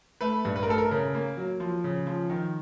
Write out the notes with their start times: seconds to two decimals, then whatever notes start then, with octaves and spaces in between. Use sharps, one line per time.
0.21 A3 B4
0.45 G2
0.56 B4
0.63 A#4
0.68 A3 A4
0.78 A#4
0.91 C#3 A#4
1.15 A#3
1.37 F#3
1.60 F3
1.84 C#3
2.07 F3
2.30 D#3